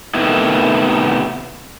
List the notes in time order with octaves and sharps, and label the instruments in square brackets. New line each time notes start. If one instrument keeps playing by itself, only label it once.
[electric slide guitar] A2 C3 D#3 B3 E4